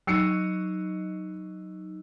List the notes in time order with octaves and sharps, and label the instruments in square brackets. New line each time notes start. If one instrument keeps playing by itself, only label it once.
[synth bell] F#3 D#4 D#5 [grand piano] E6 C7 C#7